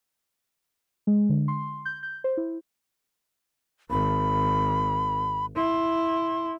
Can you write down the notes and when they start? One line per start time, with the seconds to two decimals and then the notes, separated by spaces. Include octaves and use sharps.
1.07 G#3
1.29 D3
1.48 C6
1.85 G6
2.03 G6
2.24 C5
2.37 E4
3.90 G#1 B5
5.56 E4 C6